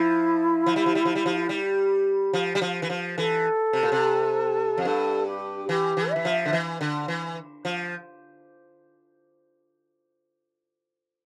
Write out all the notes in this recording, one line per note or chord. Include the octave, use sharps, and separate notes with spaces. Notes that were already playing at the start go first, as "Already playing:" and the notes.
Already playing: F3 E4
F3
G3
F3
G3
F3
G3
F3
G3
F3
G3
F3
E3
F3
E3 A4
C3
A#2
C3
F2
G2 A4
G4
E3 G4
E3
E3 E5
F3
D3
E3
D3
E3
F3